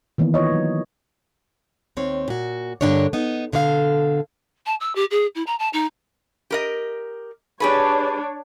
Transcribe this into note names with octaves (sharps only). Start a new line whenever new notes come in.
D#3 E3 A#3 B3 E4
F4 C#5 D#5
F#3 A#3
D#2 C4 C#5
A#2 F#4
G2 B2 D3 D4 A#4 C#5
B3 D#4
B2 D3 A4 C#5 F5
A5
E6
G4
G#4
E4
A#5
A5
D#4
G4 A#4 D#5
D4 G4 G#4 B4 C#5